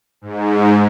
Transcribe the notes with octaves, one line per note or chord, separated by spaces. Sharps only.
G#2